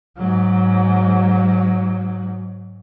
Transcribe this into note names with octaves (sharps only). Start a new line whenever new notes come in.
G#2 F#3